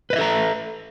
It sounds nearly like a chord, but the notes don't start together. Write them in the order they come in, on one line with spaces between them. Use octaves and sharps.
B4 D#5 E5 A4 A#5